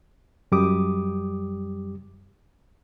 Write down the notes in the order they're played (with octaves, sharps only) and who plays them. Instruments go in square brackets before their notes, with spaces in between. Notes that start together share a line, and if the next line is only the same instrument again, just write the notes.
[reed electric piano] F#2 G3 G4 D6 D#6